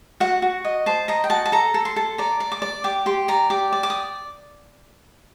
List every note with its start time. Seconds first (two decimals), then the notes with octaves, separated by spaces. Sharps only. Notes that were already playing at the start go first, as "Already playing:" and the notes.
0.20 F#4 F#5
0.42 F#4
0.64 D#5
0.86 C5 A5
1.08 D#5 A#5
1.24 G5
1.30 F#4 A5
1.46 A5
1.52 A4 A#5
1.74 A4
1.85 C6
1.96 A4
2.18 D5 A#5
2.40 D5
2.52 D6
2.62 D5
2.84 G4 D6
3.06 G4 C6
3.28 D5 A#5
3.50 G4 D6
3.72 D5
3.83 D6
3.90 D#6